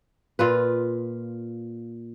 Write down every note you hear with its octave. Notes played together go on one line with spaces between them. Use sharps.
A#2 F4 B4